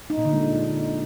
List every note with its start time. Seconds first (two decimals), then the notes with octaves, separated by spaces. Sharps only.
0.10 D#4
0.18 A#2
0.25 D3
0.33 G#3